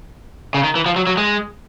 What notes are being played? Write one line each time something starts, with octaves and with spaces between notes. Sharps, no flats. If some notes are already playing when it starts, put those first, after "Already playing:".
C#3
D#3
E3
F3
F#3
F#3
G#3